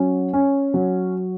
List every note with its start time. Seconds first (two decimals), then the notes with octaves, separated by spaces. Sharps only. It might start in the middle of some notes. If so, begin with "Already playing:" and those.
Already playing: F#3 C#4
0.33 C#4
0.74 F#3